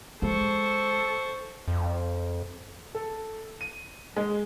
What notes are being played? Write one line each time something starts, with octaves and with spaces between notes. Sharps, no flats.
G#3 A4 C5 C#6
F2
A4
D#7
G#3